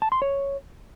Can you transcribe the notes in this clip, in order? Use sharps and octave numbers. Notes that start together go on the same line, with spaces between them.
A5
C6
C#5